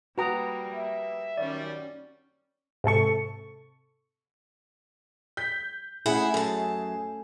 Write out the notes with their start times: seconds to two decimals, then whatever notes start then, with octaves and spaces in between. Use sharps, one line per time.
0.18 G3 A#3 F#4 B4 G5 A#5 D#6
0.74 E5
1.37 F#2 D#3 G3 C#4 D5
2.84 G#2 C3 A4 C#6
5.37 G6 B6
6.06 A3 C#4 E4 G#4 F#5
6.34 F#2 A4 A5